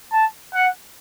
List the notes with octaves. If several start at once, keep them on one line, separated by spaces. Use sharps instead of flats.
A5
F#5